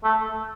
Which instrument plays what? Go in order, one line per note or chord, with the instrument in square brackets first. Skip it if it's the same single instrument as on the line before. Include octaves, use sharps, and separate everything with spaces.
[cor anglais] A3